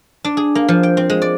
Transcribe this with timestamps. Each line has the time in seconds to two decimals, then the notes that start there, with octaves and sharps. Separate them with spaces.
0.25 D4
0.37 G#4
0.55 A#3
0.68 F3
0.83 G5
0.97 C4
1.10 G#3
1.22 D5